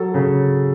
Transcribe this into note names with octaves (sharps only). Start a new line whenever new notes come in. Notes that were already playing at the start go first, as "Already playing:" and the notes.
Already playing: F#3 A4
C#3